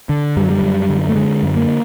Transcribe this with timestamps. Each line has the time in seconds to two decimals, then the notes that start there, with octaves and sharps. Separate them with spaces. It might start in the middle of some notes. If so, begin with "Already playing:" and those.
0.09 D3
0.37 F#2 G3
0.44 F#3
0.50 G3
0.62 F#2
0.89 D3
1.09 A3
1.16 D3 G#3
1.43 F#2
1.56 A#3